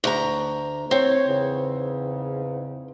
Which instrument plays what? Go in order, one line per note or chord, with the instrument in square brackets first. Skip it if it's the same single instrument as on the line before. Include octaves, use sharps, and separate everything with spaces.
[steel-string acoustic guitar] D2 A#5
[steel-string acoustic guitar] C4 [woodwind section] C#5
[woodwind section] E2 G#2 C#3